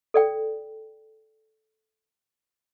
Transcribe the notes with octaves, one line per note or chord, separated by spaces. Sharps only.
A4 D5 G5